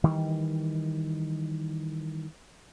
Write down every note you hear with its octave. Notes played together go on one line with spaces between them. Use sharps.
D#3 E3 G3